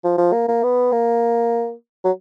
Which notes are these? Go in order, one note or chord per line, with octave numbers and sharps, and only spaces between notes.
F3
F3
A#3
A#3
B3
A#3
F#3